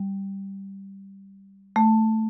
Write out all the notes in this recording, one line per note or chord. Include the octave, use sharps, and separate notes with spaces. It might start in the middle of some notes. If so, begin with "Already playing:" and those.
Already playing: G3
A3